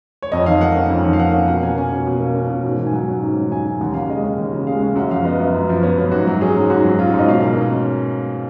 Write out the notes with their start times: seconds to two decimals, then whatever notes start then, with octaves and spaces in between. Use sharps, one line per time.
0.22 C#5
0.32 F2 D#5
0.46 D#3 F5
0.61 A#3 F#5
0.76 C#4
0.90 F2
1.05 D#3
1.13 F5
1.19 A#3 F#5
1.33 C#4 F5
1.48 B2 F#5
1.62 A#3 G#5
1.78 C#4 G#5
1.91 B2
2.07 B2
2.20 A#3
2.36 C#4
2.50 B2
2.64 G#2
2.79 D#3
2.87 G#5
2.93 F#3 F#5
3.08 C#4
3.22 G#2
3.37 D#3
3.51 F#3 G#5
3.66 C#4
3.81 D#2 F#5
3.94 C#3 F5
4.09 G#3 D#5
4.24 C#4
4.38 D#2
4.53 C#3
4.67 G#3 F5
4.82 C#4
4.96 F#2 F#5
5.11 F3 F5
5.25 B3 D#5
5.40 F#2
5.54 F#2
5.69 F3
5.83 B3 C#5
5.98 F#2 B4
6.11 G#2 F#4
6.27 F#3
6.41 C#4 G#4
6.55 G#2
6.70 G#2 F#4
6.85 F#3
6.99 C#4 F4
7.09 F#4
7.14 G#2
7.19 D#5
7.28 B2 F5
7.42 A#3
7.57 C#4